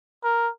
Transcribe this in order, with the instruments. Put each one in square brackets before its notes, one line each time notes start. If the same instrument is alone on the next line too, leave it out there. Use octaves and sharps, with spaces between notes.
[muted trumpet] A#4